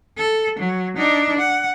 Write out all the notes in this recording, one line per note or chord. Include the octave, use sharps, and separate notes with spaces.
A4
F#3
D4 D#4
F#5